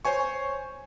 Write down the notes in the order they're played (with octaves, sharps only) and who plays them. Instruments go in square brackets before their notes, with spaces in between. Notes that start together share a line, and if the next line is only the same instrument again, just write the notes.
[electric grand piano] C5 C#5 G#5 C#6